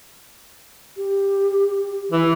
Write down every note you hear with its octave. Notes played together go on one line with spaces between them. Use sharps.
G4
E3